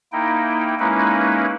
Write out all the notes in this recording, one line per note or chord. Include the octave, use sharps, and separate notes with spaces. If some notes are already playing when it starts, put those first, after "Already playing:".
A#3 D#4 E4 G5
G#3 A#3 C#4 D#4 E4 B4